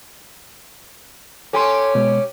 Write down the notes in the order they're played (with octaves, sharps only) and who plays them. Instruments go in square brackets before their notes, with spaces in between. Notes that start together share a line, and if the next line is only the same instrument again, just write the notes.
[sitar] C#4 G4 [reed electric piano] A4 G#5 C6
[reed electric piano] B2 G#3